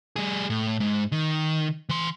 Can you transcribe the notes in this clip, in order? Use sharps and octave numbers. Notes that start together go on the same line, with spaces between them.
G3 G#4
A2
G#2
D#3
E3 C6